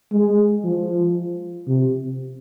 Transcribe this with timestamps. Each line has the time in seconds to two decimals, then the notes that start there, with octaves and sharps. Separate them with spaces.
0.13 G#3
0.64 F3
1.68 C3